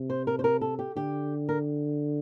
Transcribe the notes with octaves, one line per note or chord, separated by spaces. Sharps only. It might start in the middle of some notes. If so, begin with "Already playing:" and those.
Already playing: C3
C5
A#4
C5
A#4
A4
G4
D3 G4
A#4